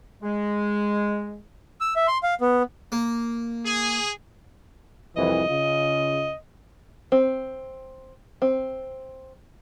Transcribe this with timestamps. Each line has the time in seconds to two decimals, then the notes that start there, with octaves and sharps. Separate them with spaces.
0.22 G#3
1.81 E6
1.96 E5
2.07 C6
2.23 F5
2.41 B3
2.92 A#3
3.65 G#4
5.17 C2 F2 E3 D#5
5.49 C#3 F4
7.12 C4
8.42 C4